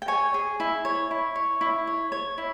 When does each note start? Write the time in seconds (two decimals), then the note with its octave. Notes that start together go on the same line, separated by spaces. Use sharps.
0.02 G5
0.08 C#5 G#5
0.34 G#4
0.60 E4
0.85 C#5
1.11 E4
1.36 C#5
1.61 E4
1.87 C#5
2.12 C#5
2.38 E4